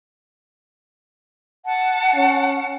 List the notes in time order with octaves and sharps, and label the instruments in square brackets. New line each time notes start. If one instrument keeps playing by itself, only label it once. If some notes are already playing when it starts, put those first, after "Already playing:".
[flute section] F#5 A5
[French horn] C#4